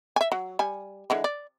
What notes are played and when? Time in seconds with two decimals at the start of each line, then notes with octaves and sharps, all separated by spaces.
0.16 E5 G#5
0.32 F#3
0.59 G3 G#5
1.10 D3 E3 G#3
1.24 D5